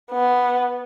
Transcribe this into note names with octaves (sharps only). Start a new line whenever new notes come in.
B3